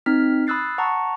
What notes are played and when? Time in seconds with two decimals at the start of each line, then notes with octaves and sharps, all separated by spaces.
0.06 C4 D#4 F6 B6
0.47 B5 D#6 E6 F#6 A6 C7
0.78 F#5 A5 A#5 C#6